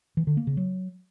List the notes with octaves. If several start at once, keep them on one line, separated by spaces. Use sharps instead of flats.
E3
D3
A#3
C#3
F#3